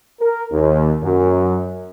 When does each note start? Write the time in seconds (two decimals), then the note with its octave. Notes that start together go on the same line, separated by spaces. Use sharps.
0.19 A#4
0.51 D#2
1.01 F#2